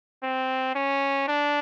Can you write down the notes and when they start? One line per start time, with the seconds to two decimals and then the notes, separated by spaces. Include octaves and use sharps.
0.23 C4
0.75 C#4
1.28 D4